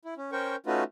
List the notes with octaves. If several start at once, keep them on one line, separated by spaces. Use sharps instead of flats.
E4
C#4
C#4 A#4 C5 G5 C#6
A3 C#4 D#4 F4 F#4 B4